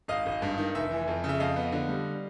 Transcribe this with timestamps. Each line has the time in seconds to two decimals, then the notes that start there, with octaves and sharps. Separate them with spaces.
0.08 G#1 D#5 F5
0.26 G#1
0.42 G2
0.58 D#3
0.75 F1 E5
0.91 E3
1.07 F2
1.24 C#3
1.29 E5
1.40 F2 D#5 F5
1.56 B3
1.72 D3
1.89 G3